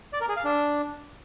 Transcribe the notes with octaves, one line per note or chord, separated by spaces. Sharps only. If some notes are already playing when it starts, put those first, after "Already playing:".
D5
A#4
G#4
F5
D4